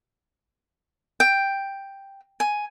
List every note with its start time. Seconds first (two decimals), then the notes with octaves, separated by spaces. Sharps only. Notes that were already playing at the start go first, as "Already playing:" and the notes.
1.20 G5
2.40 G#5